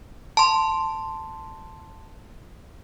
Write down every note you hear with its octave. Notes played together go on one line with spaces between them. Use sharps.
A5 C6